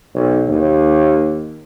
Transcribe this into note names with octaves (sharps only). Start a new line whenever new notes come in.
B1
D#2